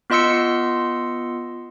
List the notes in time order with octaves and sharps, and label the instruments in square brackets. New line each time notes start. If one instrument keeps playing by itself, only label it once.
[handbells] B3 F4 D#5 C6 E6 C#7